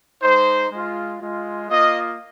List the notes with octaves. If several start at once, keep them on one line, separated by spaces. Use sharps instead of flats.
G#3 D#4 C5
G#3 F4
G#3 F4
A#3 F4 D#5